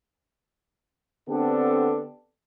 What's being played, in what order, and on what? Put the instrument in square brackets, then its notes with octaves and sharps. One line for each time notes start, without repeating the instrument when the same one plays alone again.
[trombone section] D3 B3 C4 D4 G4 A4